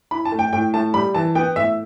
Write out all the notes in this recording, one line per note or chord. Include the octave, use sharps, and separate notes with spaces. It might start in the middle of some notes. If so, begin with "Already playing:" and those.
E4 B5
A5
A3
G5
A2 G5
A2 A5
G3 B5
E3 A5
B3 G5
A2 E5